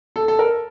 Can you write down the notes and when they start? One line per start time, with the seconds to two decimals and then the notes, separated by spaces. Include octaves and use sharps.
0.16 A4
0.28 A4
0.39 A#4